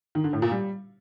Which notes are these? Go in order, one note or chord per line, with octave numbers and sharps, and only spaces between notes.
D#3
D3
A2
A#2
G3